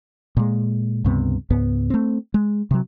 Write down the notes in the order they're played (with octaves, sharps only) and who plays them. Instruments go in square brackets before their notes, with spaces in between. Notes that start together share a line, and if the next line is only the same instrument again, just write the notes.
[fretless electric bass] A#2 G#3
C#2 G2 C3 B3
C#2 G#2 B3
A3 C4
G#3
C3 F#3